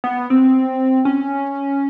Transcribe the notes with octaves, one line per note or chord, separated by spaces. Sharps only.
B3
C4
C#4